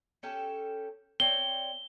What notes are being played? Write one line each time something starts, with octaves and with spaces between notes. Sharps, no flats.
C#4 G4 A4
C4 C#5 D5 G7